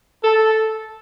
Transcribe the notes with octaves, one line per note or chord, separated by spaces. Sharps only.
A4